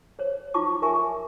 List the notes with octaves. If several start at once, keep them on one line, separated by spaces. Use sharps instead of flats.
C5 C#5
D#4 F4 A5 C#6 D6
A#4 E5 G#5 C#6